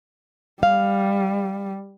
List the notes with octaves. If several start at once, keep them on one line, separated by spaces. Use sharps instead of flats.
G3 F5